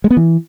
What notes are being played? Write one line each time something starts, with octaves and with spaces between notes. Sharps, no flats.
G#3
B3
E3